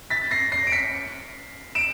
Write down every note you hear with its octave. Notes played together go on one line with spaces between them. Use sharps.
A6 B6
A#6 C7
A#6 C7
D7
B6 C#7
D7 E7